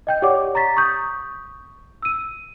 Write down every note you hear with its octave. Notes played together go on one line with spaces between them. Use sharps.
D#5 G5 G6
G4 C#5 D5 F#5 D6
A#5 C#6 A6 B6
C#6 D#6 G6
E6 D#7